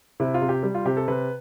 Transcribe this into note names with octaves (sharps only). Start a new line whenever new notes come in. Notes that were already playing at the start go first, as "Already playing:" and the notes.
C3 E4
F4
C3
G4
G3
F4
C3 G4
A4
C3 B4